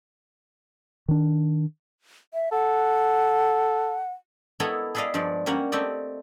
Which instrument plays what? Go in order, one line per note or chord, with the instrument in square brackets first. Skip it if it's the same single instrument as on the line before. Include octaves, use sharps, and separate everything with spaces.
[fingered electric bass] D#3 D4
[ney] E5
[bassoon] A4 [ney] F#5
[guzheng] B3 E4 A4 A#4 C#5 D#5
G#4 A4 B4 D5 D#5 F5
G2 F3 G#3 D5
G3 A#3 C#4 A#4 F#5
A3 C4 G4 D5 D#5